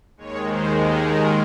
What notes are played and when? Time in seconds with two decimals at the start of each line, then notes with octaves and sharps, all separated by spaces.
0.17 D#2 D#3 G#3 C#5
0.47 C5
0.78 A#4
1.08 A#4